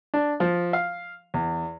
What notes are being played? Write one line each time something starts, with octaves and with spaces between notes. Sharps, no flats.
D4
F3
F5
E2